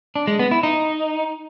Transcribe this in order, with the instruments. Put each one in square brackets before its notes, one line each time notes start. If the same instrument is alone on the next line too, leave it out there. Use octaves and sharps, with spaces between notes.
[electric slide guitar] D4
G#3
B3
E4
D#4